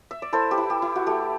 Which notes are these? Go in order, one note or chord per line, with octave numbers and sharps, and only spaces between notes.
E5
D5
E4 A4 C5
G4 B4
E4
G4
E4
F#4
A3 G4